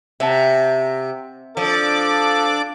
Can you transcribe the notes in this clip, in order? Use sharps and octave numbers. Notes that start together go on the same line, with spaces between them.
C3 E5 F#5 A5
F3 D4 A4 D5 D6